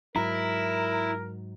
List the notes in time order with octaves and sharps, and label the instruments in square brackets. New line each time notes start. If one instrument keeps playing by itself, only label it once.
[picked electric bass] G#2 F#3 [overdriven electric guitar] E4 [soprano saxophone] A#4 [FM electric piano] A#5